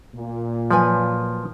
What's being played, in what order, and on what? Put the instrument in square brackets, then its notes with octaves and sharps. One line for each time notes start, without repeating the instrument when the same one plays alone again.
[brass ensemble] A#2
[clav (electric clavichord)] F3 [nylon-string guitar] F#3 B4 G#5